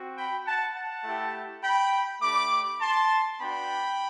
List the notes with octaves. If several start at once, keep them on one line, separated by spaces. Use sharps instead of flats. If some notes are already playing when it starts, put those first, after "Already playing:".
Already playing: C4 F#4
G5 B5
F#5 A5
F#5 A5
A3 E4 G4
G5 B5
A3 D4 G4 B5 D6
A5 C6
B3 D4 F#4 G5 B5